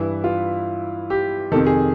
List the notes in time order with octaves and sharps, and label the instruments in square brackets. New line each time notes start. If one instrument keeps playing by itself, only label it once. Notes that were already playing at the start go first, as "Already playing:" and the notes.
Already playing: [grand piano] G2 E3 E4
F4
G4
D#3 A4
F2 C3
G#4